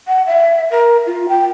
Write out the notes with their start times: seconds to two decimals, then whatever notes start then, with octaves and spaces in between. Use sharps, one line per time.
0.07 F#5
0.27 E5
0.71 A#4
1.07 F4
1.29 G5